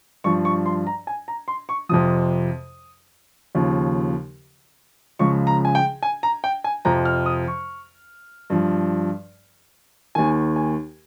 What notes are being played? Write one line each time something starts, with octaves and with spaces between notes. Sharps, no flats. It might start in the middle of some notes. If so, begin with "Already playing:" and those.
G2 F3 C#6
C#6
C6
A#5
G#5
A#5
C6
C#6
F2 C3 F3 D#6
D#2 C#3 F3
C#2 C#3 F3 C#6
A#5
G#5
G5
G#5
A#5
G5
G#5
F2 C3 F3 A#5
F6
D#6
C#6
G2 F3
D#2 D#3 G#5
G#5